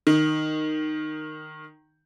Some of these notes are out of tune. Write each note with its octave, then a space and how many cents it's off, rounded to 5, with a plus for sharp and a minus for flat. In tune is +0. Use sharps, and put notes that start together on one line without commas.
D#3 -10